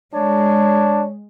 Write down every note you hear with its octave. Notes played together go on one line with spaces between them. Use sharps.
G#3 D4 C#5